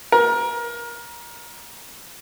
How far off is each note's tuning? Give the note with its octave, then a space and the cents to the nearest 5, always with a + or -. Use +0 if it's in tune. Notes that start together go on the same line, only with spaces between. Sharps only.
A#4 +25